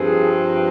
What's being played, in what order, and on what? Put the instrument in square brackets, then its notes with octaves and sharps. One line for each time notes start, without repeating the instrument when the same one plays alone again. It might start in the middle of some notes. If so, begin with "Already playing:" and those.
Already playing: [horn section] G2 F3 C4 G#4